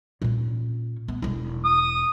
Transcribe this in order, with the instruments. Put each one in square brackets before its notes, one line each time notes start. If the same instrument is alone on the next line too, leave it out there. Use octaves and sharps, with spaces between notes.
[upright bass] A#2 C#4
B3
E1 E4
[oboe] D#6